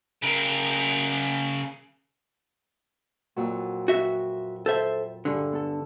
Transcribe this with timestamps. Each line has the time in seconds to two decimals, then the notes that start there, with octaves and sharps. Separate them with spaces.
0.22 C#3 A#4
3.36 F2 A#2 F#3
3.88 F#4 E5
4.66 A4 C5 E5
5.25 G2 D3 G#4
5.52 B3 A4